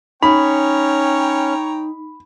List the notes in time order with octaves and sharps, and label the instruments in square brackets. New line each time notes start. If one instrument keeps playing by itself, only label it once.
[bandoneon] C#4 [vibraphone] D#4 [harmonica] C#5 G5 A#5 [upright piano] B5